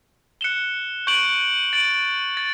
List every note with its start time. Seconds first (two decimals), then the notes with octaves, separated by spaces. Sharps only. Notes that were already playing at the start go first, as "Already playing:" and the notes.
0.41 F#6 C#7 E7 G7
1.07 C#6 G6 D7 F#7
1.73 A6 D7 F#7
2.37 A6